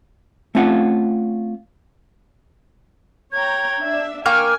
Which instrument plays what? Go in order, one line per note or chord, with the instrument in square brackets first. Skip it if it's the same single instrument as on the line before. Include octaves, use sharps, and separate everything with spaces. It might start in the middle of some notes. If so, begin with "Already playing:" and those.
[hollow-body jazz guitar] A3 C4 C#4 F4 F5 F#5
[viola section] C#5 G5 A#5 [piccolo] G#6
[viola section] D4 E5
[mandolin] A#3 G5 [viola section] G#5 [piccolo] C#6 [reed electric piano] F6